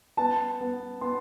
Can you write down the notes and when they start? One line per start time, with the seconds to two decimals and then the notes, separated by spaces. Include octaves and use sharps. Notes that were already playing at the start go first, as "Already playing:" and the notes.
0.17 B3 A5
0.61 B3
1.01 B3 C6